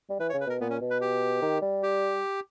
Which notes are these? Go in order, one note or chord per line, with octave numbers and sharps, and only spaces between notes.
G3
E3 B4
C#5
C#3
B4
B2 A#4
A#2 B3
C#4
B2
B4
G4
D#3
G3
G4